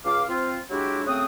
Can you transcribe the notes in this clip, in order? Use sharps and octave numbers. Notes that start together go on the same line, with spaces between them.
C#2 F5 D6
C4 F4
F#3 G#3 D4 E4 F#4 G4
C#3 A3 C4 F#4 D#6